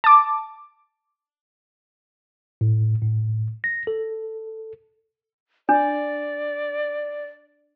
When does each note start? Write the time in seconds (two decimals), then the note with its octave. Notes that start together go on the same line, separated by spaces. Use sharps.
0.04 A5 D6
2.61 A2
3.02 A2
3.64 A#6
3.87 A4
5.69 D4 D5